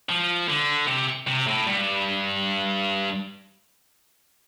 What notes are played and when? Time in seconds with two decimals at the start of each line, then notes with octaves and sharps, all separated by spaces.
0.09 F3
0.49 D3
0.88 C3
1.27 C3
1.47 A2
1.67 G2